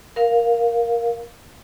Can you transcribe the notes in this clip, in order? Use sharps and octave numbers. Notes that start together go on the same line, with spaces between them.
A#4 F5